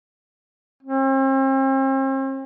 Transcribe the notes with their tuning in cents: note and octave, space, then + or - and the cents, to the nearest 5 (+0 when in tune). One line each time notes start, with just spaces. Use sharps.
C4 +45